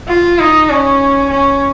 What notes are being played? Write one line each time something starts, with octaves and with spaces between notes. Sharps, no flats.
F4
D#4
C#4
C#4